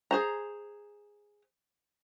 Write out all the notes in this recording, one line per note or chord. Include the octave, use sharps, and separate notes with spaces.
G#4 C5 A#5